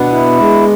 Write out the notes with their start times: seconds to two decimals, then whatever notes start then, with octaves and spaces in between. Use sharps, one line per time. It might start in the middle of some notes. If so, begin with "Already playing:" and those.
Already playing: B2 B3 D4
0.12 E4
0.39 G#3